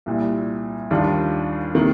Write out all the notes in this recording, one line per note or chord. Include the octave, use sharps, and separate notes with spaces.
C2 A#2 G3
D#2 D#3 G3 D4 F4
C3 D#3 A#3